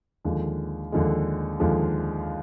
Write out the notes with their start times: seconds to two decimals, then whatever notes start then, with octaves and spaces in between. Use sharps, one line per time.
0.25 D#2 D3 F3 G#3
0.92 D#2 D3 F3 G#3
1.60 D#2 D3 F3 G#3